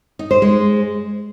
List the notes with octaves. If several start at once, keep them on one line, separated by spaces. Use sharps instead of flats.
D#4
C5
G#3